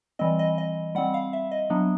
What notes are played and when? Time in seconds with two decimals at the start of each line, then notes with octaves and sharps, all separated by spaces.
0.19 E3 G3 C4 D#5
0.39 D#5
0.58 D#5
0.95 G3 C4 F#5
1.14 F5
1.33 E5
1.51 D#5
1.70 F#3 B3 D4